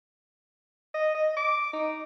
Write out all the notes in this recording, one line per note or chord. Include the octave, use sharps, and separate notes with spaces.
D#5
D#5
D6
D#4